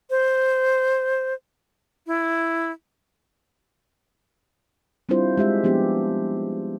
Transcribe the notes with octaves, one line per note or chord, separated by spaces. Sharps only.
C5
E4
G3 C4 D4 E4 F4 C5
G#3 G4 E5
F3 B3 D4 G4